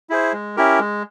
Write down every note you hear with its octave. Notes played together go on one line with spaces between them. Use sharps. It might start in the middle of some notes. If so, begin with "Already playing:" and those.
E4 G#4 C5
G#3
C#4 E4 G4 A#4
G#3